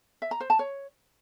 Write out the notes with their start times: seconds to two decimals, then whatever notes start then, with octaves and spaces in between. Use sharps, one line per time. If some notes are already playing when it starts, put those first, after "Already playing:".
0.22 E5
0.31 A#5
0.40 C5
0.50 A5
0.59 C#5